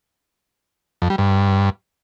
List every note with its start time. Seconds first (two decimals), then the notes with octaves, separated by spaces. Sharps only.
1.02 F2
1.10 G3
1.18 G2